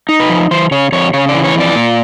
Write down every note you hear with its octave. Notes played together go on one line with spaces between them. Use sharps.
D#4
B4
F3
E3 C5
C#3 C#5
F2 C#5
C#3 C#5
D5
E3
C#5
F2 D5
A#2